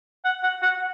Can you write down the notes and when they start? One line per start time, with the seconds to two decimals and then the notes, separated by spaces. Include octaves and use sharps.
0.24 F#5
0.43 F#5
0.62 F#5